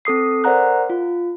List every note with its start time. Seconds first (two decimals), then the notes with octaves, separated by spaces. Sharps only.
0.05 C4 A4 D#6 C7
0.44 A#4 C5 D5 F#5 A#5 F#6
0.90 F4